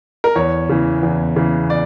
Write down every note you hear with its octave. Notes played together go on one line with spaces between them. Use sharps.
A#4
E2 C#5
C#3 E3
E2
C#3 E3
D5